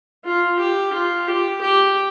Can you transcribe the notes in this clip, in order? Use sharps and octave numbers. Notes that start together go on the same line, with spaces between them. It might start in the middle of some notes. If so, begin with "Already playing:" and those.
F4
G4
F4
G4
G4